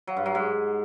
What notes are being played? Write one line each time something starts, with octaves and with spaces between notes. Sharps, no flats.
F#3
G2
F#3
G#2